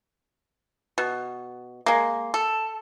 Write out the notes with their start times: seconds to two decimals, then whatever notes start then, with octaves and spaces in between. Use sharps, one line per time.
0.98 B2
1.86 G#3 A#3
2.34 A4